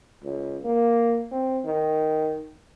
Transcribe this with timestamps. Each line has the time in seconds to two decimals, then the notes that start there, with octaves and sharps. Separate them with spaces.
0.23 C#2
0.64 A#3
1.31 C4
1.65 D#3